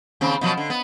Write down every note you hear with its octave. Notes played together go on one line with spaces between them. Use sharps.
D#2 C#3 C4
B2 F3 F#3
D3
B3